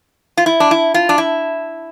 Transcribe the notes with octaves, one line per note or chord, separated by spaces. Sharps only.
F4
E4
D4
E4
F4
D4
E4